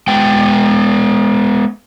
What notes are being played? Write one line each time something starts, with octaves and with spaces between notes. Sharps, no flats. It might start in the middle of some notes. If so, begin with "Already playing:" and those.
G#3 B3 G5